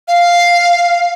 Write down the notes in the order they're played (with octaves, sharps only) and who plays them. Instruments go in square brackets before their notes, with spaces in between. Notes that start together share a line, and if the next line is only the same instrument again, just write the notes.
[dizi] F5